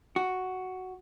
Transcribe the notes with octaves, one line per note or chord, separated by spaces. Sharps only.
F#4